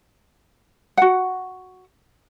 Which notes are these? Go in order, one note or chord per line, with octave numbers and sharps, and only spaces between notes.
F#4 F#5